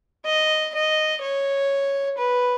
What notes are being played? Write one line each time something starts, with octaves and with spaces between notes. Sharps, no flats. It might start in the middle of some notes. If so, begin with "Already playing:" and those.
D#5
D#5
C#5
B4